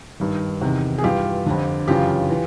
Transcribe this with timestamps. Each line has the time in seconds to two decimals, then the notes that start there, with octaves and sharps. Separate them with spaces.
0.20 G2 D#3
0.61 E2 C3 D#3
0.98 G#4
1.03 G2 E3 F4 G4
1.46 F2 D3
1.88 F#2 C#3 E3 F4 G4
2.30 E3